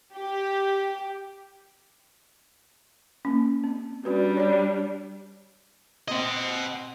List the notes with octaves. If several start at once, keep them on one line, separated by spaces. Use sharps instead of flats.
G4
A#3 C#4
C4
G3 C#4 D4 F#4 B4
C#5 D5
C4 D#5 F#5